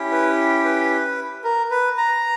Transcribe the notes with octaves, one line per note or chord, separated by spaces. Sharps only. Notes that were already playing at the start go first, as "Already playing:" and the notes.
Already playing: C#4 E4 G4
B4
B4
A#4
B4
A#5